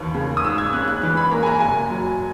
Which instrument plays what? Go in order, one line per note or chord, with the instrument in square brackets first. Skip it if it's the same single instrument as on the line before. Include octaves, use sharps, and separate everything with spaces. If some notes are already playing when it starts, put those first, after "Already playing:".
Already playing: [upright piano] E1 D#2 E3
C#3
D#6
G#2 E6
G#6
C#4 F#6
F#6
E3 F#6
B5
A#3 A#5
G#5
A#5
F#1 G#5
F#3